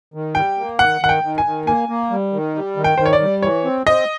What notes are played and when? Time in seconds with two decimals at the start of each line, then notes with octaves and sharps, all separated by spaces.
0.14 D#3
0.35 G3 G5
0.57 A#3
0.79 D#3 F#5
1.01 D#3 F#5
1.09 G5
1.23 D#3
1.38 G#5
1.45 D#3
1.67 A#3 G#5
1.89 A#3
2.11 G3
2.33 D#3
2.55 G3
2.77 D#3
2.84 G5
2.98 D#3 C5
3.06 C#5
3.13 D5
3.21 G3
3.42 E3 C#5
3.64 C4
3.87 C4 D#5